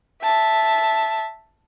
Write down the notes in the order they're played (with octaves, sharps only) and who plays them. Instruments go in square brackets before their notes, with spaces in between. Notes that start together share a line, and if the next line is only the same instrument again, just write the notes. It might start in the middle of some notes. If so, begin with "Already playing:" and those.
[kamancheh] E5 A5